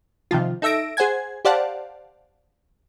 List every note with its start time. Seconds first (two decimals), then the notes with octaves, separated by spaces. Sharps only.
0.31 C3 D#3 F3 F4
0.62 D#4 A4 E5 E6 A#6 D7
0.97 G#4 C5 F#5 G#5 G#6
1.45 G4 C5 D5 F5 F#5 A5